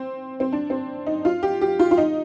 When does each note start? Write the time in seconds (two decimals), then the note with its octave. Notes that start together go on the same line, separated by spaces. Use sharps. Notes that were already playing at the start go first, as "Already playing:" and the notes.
Already playing: C4
0.40 C4
0.52 D4
0.70 C4
1.06 D#4
1.25 F4
1.43 G4
1.61 G4
1.79 F4
1.91 F4
1.98 D#4